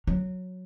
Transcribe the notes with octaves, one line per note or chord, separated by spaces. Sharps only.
F#3